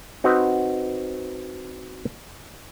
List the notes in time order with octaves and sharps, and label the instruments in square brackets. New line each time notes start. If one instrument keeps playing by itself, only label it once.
[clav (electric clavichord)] C4 D#4 F#4 B4